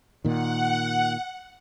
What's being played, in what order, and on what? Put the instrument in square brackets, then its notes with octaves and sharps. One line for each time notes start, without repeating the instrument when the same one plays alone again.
[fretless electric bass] A#2 D#3 [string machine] F#5